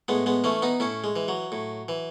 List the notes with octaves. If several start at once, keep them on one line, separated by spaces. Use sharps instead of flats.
A2 G#3 B3
G#3 B3
E3 A3 C#4
B3 D#4
A2 C#4 E4
G#3
E3
F#3
A2
E3